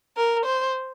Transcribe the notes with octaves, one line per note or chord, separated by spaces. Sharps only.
A#4
C5